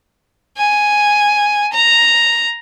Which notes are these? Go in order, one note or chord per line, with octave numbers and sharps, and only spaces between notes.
G#5
A#5